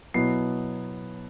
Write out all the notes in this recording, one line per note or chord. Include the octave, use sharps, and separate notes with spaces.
B2 F#3 B3 E4 C7